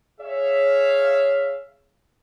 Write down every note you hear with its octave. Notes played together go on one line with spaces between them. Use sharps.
G#4 C#5 E5 F5